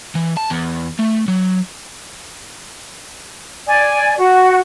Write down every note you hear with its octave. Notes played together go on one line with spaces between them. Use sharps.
E3
A5
E2
A3
F#3
D5 G#5
F#4